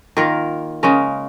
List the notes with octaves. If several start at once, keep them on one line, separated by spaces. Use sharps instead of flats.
D#3 A#3 F4 A#4
C#3 G#3 C#4 A#4